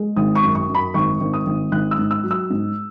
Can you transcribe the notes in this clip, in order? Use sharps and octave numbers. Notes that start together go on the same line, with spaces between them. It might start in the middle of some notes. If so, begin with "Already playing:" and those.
Already playing: G#3
G#1 D#6
C#6
F#2
C#6
F#2
B5
G#1 C#6
G#1
D#6
G#1
G#1 F#6
E6
G#2
E6
F#3
E6
G#2